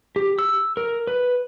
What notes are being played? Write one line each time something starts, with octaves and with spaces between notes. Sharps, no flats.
G4
E6
A#4
B4